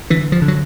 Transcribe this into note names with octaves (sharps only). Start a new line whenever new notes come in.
D3 E3
F3
D3
F#3